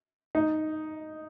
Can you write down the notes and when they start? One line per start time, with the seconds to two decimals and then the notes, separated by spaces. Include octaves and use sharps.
0.35 D#4